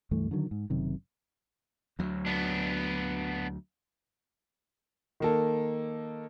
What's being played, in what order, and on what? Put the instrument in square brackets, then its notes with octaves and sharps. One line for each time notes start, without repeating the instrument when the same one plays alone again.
[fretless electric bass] C#2 G2 E3 A3
D3 D#3 F#3
G#2
F#1 F#2 C3 D#3
[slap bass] D2 F#3
[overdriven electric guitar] B3 D4
[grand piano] D#3 A#3 A4